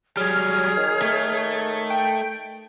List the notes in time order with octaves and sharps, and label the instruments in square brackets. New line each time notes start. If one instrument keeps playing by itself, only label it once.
[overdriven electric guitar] F#3 G3 [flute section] G#4 C#5 [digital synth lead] F6
[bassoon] D#3
[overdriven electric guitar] A3
[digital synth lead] G5